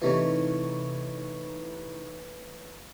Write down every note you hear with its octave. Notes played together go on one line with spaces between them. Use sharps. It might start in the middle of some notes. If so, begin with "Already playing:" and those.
C3 E3 A3 C#4 D#4 E4